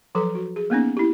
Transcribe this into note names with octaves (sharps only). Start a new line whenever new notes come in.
F3 F#3 A4 B4 A#5
F#4
G#4
A#3 B3 C#4 D#4
E4 G4